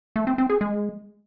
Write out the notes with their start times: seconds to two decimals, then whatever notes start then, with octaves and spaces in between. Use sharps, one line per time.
0.16 A3
0.27 C4
0.38 C4
0.50 G#4
0.61 G#3